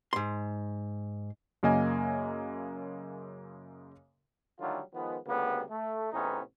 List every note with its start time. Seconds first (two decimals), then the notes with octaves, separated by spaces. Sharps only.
0.13 G#2 C6
1.63 F#2 C#3 A#3 A#4 D#5 G#5
4.59 D3 D#3 F#3 G3 A3 F4
4.94 D#3 F3 G#3 B3
5.26 D2 C#3 G3 A#3 B3
5.70 A3
6.12 E2 A2 C3 B3 C#4 D#4